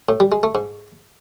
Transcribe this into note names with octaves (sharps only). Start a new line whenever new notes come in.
A2
G3
G#3
A3
G#2